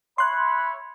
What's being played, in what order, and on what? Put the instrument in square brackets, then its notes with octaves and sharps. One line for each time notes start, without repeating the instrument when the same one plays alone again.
[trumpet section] C#5 E5 B5 [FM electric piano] C6 F#6